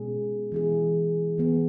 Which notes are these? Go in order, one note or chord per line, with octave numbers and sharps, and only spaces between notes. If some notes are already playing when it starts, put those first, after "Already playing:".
Already playing: B2 G#3 C#4 G#4
E3 B3 E4 G#4
E3 B3 G#4